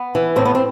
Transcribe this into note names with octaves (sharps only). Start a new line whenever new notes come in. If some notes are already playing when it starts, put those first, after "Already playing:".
Already playing: B3
E3
A2 C4
B3
C4